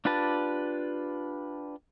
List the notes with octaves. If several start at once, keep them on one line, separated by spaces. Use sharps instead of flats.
D4 F4 G4 B4 A5